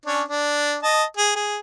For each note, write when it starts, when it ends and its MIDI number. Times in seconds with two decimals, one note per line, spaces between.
0.06 0.22 61
0.06 0.22 62
0.06 0.22 73
0.28 0.76 62
0.83 1.04 75
0.83 1.04 81
1.17 1.31 68
1.36 1.58 68